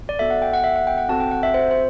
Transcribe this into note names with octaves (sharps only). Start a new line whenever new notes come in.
D5
B3 F#4 A4 E5
F#5
G5
F#5
E5
F#5
G5
F#5
C4 F#4 A4 A5
G5
F#5
E5
C5
C5